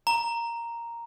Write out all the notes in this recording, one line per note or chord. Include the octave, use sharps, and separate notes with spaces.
A#5